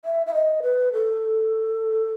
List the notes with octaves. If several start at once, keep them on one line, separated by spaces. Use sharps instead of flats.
E5
E5
D#5
B4
A4